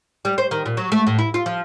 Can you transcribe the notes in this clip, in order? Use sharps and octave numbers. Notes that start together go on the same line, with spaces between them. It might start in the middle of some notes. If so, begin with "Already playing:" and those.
G3
C5
D#3
A#2
F#3
A3
A2
E4
F4
F3